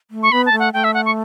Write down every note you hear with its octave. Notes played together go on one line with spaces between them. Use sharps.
A3
C#6
B3 B5
A5
A3
F#5
A3 G5
E5
F#5
C#6